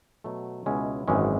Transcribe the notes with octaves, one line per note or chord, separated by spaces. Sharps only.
B2 F#3 A3
C#2 B2 G#3 C#4 E4
G#1 F#2 E3 G#3 C#4